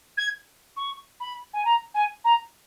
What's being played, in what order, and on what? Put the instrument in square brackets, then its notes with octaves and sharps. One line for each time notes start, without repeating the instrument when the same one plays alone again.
[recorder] G#6
C#6
B5
G#5
A#5
G#5
A#5